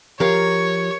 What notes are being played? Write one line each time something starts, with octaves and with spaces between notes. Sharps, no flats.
F3 G4 A#4 C#5 F5